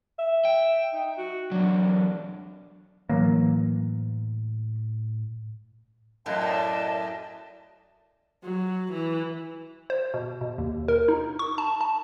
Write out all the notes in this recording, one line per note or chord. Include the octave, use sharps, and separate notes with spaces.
E5
G5
D#4
F#4
E2 F#3 D4
A2 E3 F#3 A#3
F#2 A2 D#5 F5 A5
D5 D#5 A5
F#3
E3
C5
B2
B2
D#2
A#4
D#4
C#6
A5
A5